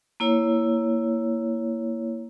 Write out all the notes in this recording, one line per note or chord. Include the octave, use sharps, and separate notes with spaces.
A#3 E4 C#5